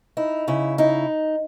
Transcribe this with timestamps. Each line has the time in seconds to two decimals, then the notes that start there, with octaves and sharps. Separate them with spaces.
0.17 D#4 E4
0.48 C#3 E4
0.78 D#4 E4